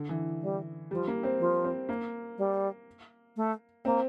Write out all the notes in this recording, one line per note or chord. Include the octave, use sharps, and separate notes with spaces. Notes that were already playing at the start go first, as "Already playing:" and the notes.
Already playing: D3
E3
G3
F3 G3
A#3
C4
F3
C4
A#3
G3
A3
A#3 C4